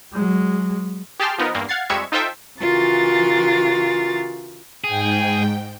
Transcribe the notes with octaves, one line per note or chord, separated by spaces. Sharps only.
F#3 G#3
G4 G#4 G5 A5 C6 F6
F3 B3 D#4 A#4
E2 G2 A#3
F5 F#5 G#6 A6 C7
F2 G3 G#3 E5 C#6 G#6
D#4 F4 A4 C5 E5 G5
C#3 E3 F4 F#4 A#4 A6
G#2 G#4 G5